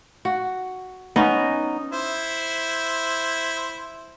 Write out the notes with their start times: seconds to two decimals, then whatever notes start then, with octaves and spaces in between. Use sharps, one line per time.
0.25 F#4
1.16 B3 C#4 D#4
1.93 E4 C5